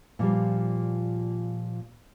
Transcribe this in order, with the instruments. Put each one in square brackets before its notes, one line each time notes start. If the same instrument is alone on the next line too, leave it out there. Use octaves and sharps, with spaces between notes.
[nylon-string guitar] A#2 F3 G3